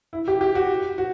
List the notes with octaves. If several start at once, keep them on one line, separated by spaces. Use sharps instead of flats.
E4
G4
G4
F#4
F#4